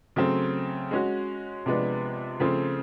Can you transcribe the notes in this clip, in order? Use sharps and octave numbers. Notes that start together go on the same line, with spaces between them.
C#3 F#3 A3 C4
G#3 C#4 F#4
C3 F3 G#3 B3 D4
C#3 F3 A3 C4